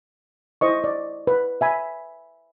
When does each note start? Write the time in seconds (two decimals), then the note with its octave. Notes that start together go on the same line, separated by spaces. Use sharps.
0.61 E4 C5 D#5 C#6
0.84 D5
1.27 B4
1.61 E5 G#5 B5